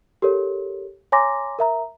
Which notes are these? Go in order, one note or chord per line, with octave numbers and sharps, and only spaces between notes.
G4 A4 A#4 C#5
C#5 G#5 A#5 C6 D6 A#6
A#4 E5 A#5